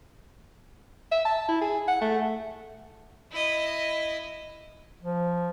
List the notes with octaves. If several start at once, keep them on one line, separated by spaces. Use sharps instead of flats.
E5
A5
E4
G#4
F#5
A3
E4 D#5
F3